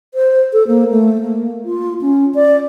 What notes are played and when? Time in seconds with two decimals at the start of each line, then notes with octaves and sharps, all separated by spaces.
0.14 C5
0.53 A4
0.67 A#3
0.90 A3
1.21 A#3
1.65 F4
2.01 C#4
2.35 D5